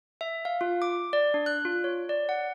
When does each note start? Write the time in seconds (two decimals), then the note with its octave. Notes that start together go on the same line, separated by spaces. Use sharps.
0.21 E5
0.45 F5
0.61 F4
0.82 D6
1.13 D5
1.34 D4
1.46 F#6
1.65 F4
1.84 C#5
2.09 D5
2.29 F#5